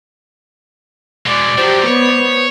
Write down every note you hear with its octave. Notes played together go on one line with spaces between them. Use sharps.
B2 G#3 D5
F3 F#3 G4 C5
B3 C#5